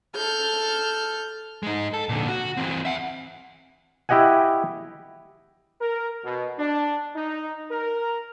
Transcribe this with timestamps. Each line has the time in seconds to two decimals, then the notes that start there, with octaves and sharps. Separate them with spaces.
0.15 A4 F6 G6
1.63 G#3 D#4
1.94 A4
2.09 A#2 D3
2.28 F#4
2.57 E3 C4
2.85 E5 F#5
4.09 E4 G4 D#5 F#5 G#5
5.81 A#4
6.24 B2
6.58 D4
7.16 D#4
7.71 A#4